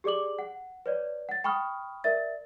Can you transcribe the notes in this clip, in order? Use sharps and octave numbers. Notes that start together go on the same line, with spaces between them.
G4 G#4 D5 D6 F#7
F#5
B4 C#5 D5
F#5 A6
G5 B5 C#6 D#6 F6
A#4 D5 E5 A6